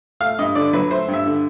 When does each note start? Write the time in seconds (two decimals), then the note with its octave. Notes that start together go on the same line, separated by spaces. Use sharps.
0.20 A3 F5
0.38 G2 D#5
0.55 D3 D5
0.73 F#3 B4
0.91 A3 C5
1.08 G2
1.14 E5
1.26 D3